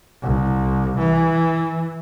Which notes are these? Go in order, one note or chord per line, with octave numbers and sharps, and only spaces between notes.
C2
E3